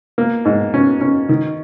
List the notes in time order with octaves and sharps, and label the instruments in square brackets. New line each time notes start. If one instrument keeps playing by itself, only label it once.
[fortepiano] A#3
G#2
C#4
C#4
D#3